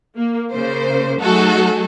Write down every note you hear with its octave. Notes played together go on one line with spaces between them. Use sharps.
A#3
C#3 A#3 C5
F#3 A3 D#4 F#4 G#4 A4